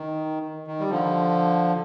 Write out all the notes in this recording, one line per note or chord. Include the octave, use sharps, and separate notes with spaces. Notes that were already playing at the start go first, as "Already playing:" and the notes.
Already playing: D#3
D#3
G3
D3 F3